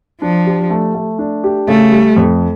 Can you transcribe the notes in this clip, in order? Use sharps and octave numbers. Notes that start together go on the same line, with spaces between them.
F3 D4
G4
A3
A3
D4
G4
C#3 A3
G3
F2